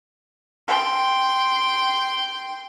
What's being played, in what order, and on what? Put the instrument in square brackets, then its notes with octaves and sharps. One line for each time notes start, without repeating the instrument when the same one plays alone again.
[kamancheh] G5 C6